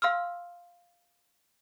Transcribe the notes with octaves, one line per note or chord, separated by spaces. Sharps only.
F5 C6 E6 F6